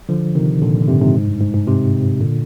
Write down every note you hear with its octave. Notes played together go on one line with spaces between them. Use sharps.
D3 F3
C3 D#3
A#2 D3
D3
G#2 C3
G#2 C3
G#2
G2
G#2
G#2
G#2 C3
A#2 D3